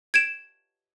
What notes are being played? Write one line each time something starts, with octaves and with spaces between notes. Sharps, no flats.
G#6 D7 E7